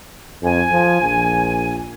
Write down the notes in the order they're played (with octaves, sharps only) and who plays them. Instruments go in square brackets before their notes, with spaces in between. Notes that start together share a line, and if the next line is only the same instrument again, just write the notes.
[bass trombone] F2 [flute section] G#5
[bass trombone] F3
A#1